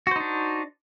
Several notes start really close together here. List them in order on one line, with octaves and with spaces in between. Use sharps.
F#4 C5 D#4 D4